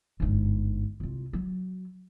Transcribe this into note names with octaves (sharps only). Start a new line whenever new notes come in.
G1 G#2
C2 F4
F#3